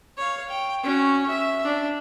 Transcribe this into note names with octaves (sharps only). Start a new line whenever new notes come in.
C#5 F5
G5
C#4 F#4
E5
D4